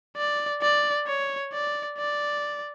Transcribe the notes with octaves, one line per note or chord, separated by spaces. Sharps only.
D5
D5
C#5
D5
D5